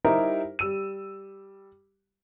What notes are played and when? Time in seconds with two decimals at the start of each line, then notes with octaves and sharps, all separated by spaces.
0.04 G3 D#4 E4 G4 A#4 C5
0.59 G3 E6 D#7